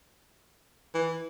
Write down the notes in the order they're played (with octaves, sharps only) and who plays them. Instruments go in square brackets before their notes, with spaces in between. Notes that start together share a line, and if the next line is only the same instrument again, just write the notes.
[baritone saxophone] E3